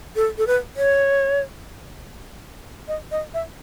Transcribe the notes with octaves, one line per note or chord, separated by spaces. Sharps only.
A4
A4
B4
C#5
D#5
D#5
E5